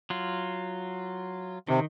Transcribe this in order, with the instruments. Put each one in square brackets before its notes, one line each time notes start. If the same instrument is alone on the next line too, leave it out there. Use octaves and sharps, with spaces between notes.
[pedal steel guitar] F#3 F4
[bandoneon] C3 [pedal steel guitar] D#3